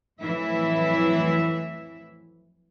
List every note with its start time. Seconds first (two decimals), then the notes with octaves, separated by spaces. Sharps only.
0.21 F2 A2 E3 F#3 E4 E5